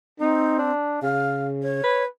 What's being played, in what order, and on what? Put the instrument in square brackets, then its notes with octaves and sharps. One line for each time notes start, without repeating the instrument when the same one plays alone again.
[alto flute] C4 [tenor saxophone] D#4
[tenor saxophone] D4
[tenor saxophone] C#3 [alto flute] F5
[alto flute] C#5
[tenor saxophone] B4